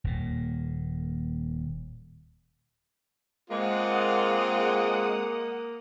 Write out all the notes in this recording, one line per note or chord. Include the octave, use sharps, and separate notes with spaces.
D#1 A#2
G#3 A#3 C4 F4 F#5 D#6